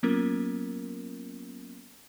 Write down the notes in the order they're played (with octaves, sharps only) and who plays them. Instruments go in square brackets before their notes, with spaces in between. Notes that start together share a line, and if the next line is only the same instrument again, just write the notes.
[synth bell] F#3 A#3 B3 C#4 F4 A#4